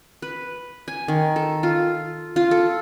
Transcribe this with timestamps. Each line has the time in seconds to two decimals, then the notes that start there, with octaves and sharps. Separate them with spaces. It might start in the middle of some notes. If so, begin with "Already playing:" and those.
0.22 B4
0.88 G#5
1.08 D#3
1.36 A4
1.63 F4
2.36 F4
2.51 A4